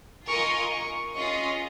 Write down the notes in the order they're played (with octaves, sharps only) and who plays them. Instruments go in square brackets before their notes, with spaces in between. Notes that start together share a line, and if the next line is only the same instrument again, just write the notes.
[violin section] F4 A#4 D#5 G#5 [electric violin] C#6
[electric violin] C#6
[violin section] C#4 F4 G#4 D#5 [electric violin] C#6